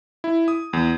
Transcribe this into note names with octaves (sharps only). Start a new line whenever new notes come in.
E4
D#6
E2